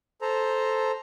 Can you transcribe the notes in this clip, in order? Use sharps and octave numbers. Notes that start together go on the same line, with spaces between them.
A4 C5 A#5